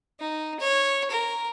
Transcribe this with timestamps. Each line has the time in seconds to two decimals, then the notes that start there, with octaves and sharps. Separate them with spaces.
0.20 D#4
0.60 C#5
1.10 A#4